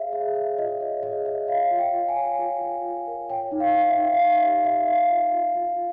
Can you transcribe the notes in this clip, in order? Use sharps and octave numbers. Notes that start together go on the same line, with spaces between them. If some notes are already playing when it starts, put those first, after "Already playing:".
Already playing: G#4 C#5 E5 F5
G#4 E5
C#5 E5
F4 D#5
C#5 D#5
G#4 D#5
C#5 E5
C#5 F5
F4
G5
F4
G#5
C#5
F4
F4
F4
A#4
C#5 G5
D#4
F5
D#4
E5
D#4
F5
C#5 E5
G4 E5
G4 E5
D#4 F5
F4
F4
F4